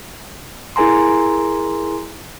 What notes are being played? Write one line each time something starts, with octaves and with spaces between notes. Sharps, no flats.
E4 G#4 A#4 G#5 A#5 C6